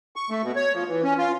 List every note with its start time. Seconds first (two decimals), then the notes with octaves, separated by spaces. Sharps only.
0.16 C#6
0.30 A3
0.43 B2
0.56 C#5
0.75 F3
0.88 E3
1.04 C#4
1.18 F4